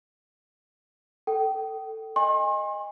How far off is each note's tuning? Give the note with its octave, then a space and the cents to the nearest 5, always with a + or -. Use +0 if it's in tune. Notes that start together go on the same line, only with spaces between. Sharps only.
A4 +10 G5 -25
D#5 -5 G#5 -35 C6 +40